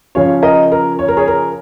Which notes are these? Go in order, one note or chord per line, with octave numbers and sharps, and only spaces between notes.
C#3 F3 C#4 C#5 F5
A#4 D#5
A#4
C#5
A#4
G#4 C#5
A#4